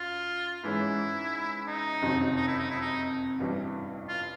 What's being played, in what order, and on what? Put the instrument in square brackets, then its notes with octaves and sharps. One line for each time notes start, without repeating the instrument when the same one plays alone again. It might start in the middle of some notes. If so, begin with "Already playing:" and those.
Already playing: [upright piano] F#2 [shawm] F4
[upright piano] G#2 E3 G#3 C#4 [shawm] E4
[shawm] D#4
[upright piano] F#1 F2 C3 D#3 F#3
[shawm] D#4
E4
D#4
E4
D#4
[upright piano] A1 G2 E3 G3
[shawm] F4